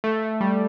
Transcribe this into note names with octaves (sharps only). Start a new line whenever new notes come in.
A3
A3
G3